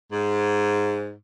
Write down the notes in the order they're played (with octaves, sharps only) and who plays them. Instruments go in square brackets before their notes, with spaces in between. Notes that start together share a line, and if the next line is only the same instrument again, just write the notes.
[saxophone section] G#2